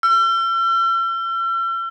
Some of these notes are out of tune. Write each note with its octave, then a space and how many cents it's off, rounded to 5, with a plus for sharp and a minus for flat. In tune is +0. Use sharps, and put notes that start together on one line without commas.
E6 +45